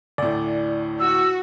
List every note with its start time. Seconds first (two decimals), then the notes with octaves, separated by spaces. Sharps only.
0.18 D2 A2 D5
1.00 F#4 E6